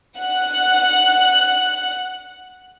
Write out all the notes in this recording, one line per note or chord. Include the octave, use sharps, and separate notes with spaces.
F#5 F#6